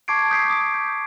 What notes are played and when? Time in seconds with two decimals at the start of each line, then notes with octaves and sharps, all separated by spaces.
0.08 A5 C#6 D6 G#6 C7 D7
0.30 D#6 G6 B6 C7 D7
0.48 D6 D#6
0.74 G6